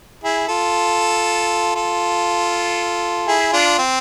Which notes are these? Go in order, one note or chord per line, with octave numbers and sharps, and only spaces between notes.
E4 G#4
F4 A4
F4 A4
E4 G#4
D4 F4
C4